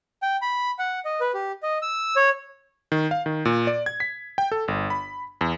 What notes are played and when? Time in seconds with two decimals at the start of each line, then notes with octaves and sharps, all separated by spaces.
0.22 G5
0.42 B5
0.79 F#5
1.05 D#5
1.21 B4
1.34 G4
1.63 D#5
1.82 E6
2.16 C#5
2.92 D#3
3.11 F5
3.26 D#3
3.45 A#2
3.67 D5
3.86 G#6
4.00 B6
4.38 G5
4.52 A4
4.68 G1
4.90 B5
5.41 E2